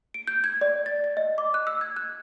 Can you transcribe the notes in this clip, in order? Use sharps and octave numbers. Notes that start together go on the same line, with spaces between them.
D7
G6
G#6
D5
A6
A6
D#5
D6
F#6
E6
G#6
F#6